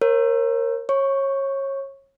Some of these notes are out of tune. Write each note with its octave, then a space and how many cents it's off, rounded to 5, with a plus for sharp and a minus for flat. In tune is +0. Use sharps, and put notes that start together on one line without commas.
A#4 +0 C#5 -40
C#5 -25 C#6 +0